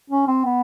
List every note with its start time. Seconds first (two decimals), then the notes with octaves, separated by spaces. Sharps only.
0.10 C#4
0.27 C4
0.45 B3